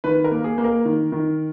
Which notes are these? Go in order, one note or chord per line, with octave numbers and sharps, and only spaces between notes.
D#3 B4
A#4
A#3
G#4
A#3
A#4
D#3
D#3